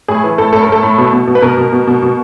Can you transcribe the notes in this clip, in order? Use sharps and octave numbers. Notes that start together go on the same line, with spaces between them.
A2 G#4
E3
A2 A4
A2 A4
A#4
A2 A4
A2
B2
B2
B2
B4
B2 A#4
B2
B2
B2
B2